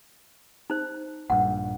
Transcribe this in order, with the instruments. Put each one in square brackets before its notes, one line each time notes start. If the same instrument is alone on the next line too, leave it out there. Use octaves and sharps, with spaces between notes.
[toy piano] D#4 C5
[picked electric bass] A#1 G2 [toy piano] F#5